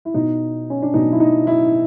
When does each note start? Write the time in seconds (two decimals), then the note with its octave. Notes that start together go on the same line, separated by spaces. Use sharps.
0.05 E4
0.14 B2 D#4
0.70 C#4
0.82 D4
0.94 B2 D#4
1.12 E4
1.20 D#4
1.47 E4